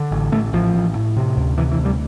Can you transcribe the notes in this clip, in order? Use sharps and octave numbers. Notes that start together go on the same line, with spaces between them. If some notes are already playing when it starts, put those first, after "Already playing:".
Already playing: D3
A1
A1 A3
A1 F3
A1
A2
C3
D2
C3 E3
E3
D2
G3